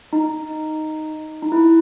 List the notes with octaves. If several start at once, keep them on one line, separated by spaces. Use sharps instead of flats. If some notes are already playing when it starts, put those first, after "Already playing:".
D#4
D#4
E4